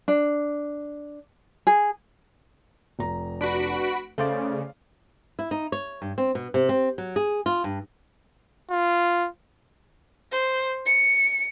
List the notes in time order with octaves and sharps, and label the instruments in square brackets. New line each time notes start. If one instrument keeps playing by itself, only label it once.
[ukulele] D4
G#4
[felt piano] F1 A#5
[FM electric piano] D4 B4 [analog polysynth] F#4 B5 D7
[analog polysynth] C#3 [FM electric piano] A3 C5 D5 [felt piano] A4 F5
[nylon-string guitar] E4
D#4
C#5
G2
C4
B2
C3
C4
F#3
G#4
F4
G2
[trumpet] F4
[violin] C5
C#7